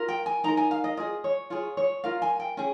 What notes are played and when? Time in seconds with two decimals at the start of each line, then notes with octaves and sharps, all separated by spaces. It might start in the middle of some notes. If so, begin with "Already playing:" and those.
Already playing: F4 A#4
0.08 G5
0.26 G#5
0.44 D#4 A#4 A#5
0.57 G#5
0.71 F5
0.84 D#5
0.97 F4 G#4 D#5
1.24 C#5
1.50 F4 G#4 C#5
1.77 C#5
2.04 F4 A#4 F5
2.22 G#5
2.40 G5
2.57 C#4 G#4